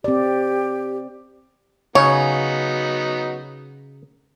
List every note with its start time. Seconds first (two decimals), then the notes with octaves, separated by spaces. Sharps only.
0.04 C4 G4 D5
1.95 C#3 F#3 B3 D#4 C#5